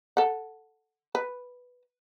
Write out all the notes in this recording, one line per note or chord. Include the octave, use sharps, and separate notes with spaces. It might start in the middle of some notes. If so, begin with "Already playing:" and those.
A4 F#5
B4